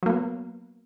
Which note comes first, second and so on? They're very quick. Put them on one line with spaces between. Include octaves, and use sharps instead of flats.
F#3 A#3 B3